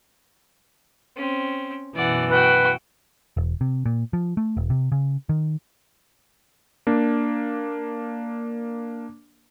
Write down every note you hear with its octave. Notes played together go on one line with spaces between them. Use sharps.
C4 C#4
F#2 B2 E3 D5 F#5
F#4 B4 G5
E1
C3
A#2
F3
A3
E1
C3
C#3
D#3
A#3 D4